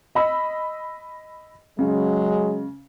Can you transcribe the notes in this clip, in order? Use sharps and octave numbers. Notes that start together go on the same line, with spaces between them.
D#5 B5 E6
C#3 F#3 G#3